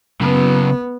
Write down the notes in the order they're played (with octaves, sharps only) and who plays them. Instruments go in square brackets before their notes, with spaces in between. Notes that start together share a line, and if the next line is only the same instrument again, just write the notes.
[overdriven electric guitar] C#3 F#3 [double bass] B3